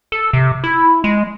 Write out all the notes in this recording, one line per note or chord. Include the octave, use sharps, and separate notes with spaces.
A4
C3
E4
G#3